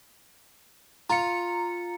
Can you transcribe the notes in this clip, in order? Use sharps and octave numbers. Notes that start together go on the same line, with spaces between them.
F4 A#5 C#7